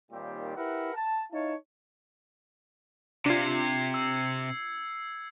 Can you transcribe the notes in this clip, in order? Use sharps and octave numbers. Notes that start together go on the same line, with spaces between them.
D#2 A#2 D#3 G3 C4 G4
E4 G4 A#4 B4 E5 F#5
A5
D#4 E4 C#5 F5 A5
C3 D4 F4 G#6 C7 C#7
E6